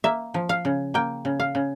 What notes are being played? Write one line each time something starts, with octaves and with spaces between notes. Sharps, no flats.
A#3 E5
F3
F5
C#3
A#3 G5
C#3
F5
C#3